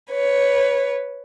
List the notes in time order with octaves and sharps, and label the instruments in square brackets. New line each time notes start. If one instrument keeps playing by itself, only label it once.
[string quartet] B4 C#5